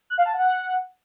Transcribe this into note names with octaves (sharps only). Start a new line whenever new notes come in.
F#6
F5
A5
F#5